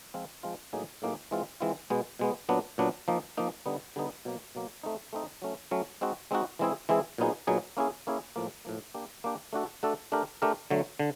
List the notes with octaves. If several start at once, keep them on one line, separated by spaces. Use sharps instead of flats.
F3 G#3 C4 F4
F3 G#3 C4 F4
A2 F#3 A#3 D#4 G#4
A2 F#3 A#3 D#4 G#4
E3 G#3 C4 F4
E3 G#3 C4 F4
B2 G#3 B3
B2 G#3 B3
A#2 F#3 B3 D4
A#2 F#3 B3 D4
F3 A#3 D#4
F3 A#3 D#4
D3 G3 B3 D#4
D3 G3 B3 D#4
B2 F#3 A#3
B2 F#3 A#3
A3 C4 D#4
A3 C4 D#4
F#3 A3 C#4
F#3 A3 C#4
G#3 C4 D#4 F#4
G#3 C4 D#4 F#4
E3 G#3 C4 E4 G#4
E3 G#3 C4 E4 G#4
A#2 F#3 B3 D#4 G#4
A#2 F#3 B3 D#4 G#4
A#3 C#4 E4 G#4
A#3 C#4 E4 G#4
A2 F3 A#3
A2 F3 A#3
A#3 D4 G4
A#3 D4 G4
A3 D4 F#4 A4
A3 D4 F#4 A4
A3 D4 G4 A#4
A3 D4 G4 A#4
D3 F#3 A3
D3